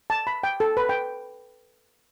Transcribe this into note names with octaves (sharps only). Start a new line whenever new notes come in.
A5
B5
G5
A4
B4
G5